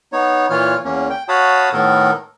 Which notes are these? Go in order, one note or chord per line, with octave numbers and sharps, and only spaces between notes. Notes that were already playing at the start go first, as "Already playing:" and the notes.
B3 D#4 C#5
A#2 E3 F4 C#5 F6
E2 A#3 C#4
G5
F#4 C#5 F5 A5 B5 D#6
A2 D#3 B3 A4 A#4